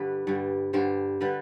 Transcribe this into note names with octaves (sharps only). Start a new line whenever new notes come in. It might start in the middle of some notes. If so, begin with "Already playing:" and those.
Already playing: G2 D3 G3 B4
G2 D3 G3
G2 D3 G3 C5
D3 G3 B4